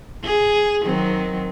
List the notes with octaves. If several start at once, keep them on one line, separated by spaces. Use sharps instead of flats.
G#4
D#3 F#3 C4